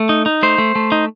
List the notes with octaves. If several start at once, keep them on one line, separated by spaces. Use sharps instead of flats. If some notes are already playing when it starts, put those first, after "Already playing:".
Already playing: A3
D#4
D#4
A3 C5
A3
A3
D#4